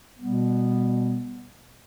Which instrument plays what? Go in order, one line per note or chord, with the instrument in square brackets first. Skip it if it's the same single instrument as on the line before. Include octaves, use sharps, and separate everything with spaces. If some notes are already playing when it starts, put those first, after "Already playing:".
[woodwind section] B2 G3 B3